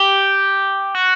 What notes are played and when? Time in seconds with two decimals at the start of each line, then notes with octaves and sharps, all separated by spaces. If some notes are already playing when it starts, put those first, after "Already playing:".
Already playing: G4
0.95 F#4